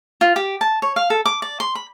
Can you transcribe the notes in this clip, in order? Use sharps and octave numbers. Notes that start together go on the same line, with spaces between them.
F4
G4
A5
C#5
F5
A4
D6
D5
C6
B5